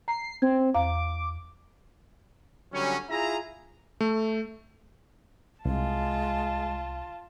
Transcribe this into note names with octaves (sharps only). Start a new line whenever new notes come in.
A#5 C7
C4 G#6
E2 F5 A#5 D6
D3 F#3 G3 C#4
E4 F4 G#4 E5 A#5
A3
C2 G#3 F4 A5